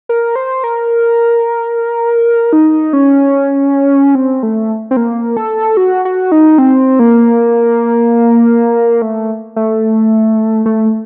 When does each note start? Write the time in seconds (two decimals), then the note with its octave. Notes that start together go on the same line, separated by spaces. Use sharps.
0.09 A#4
0.36 C5
0.64 A#4
2.53 D#4
2.93 C#4
4.15 C4
4.43 A3
4.91 C4
4.97 A#3
5.37 A4
5.77 F#4
6.05 F#4
6.32 D#4
6.58 C4
6.99 A#3
9.02 A3
9.56 A3
10.66 A3